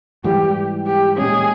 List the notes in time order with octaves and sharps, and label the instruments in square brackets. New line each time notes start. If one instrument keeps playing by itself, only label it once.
[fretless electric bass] G#2 E3 G3 [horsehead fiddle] G4
[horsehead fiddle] G4
[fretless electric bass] A#2 G#3 C#4 [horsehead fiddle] G#4